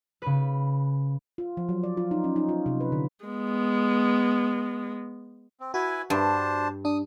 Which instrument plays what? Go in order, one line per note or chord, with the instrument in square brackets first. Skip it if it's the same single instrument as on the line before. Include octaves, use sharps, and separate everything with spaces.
[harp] C#3 B4
[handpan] F4
F3
F#3
D5
F4
D#4
C#4
D#4
F4
C3
B4
D3
[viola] G#3 B3
[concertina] C4
[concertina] E4 B4 G#5 [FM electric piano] F#4
[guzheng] G2 [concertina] D4 C5 A5
[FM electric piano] D4 [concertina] D#6